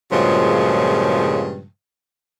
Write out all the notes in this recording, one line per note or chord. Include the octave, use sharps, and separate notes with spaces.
G2 A#2 C#3 F3 F#3 G#3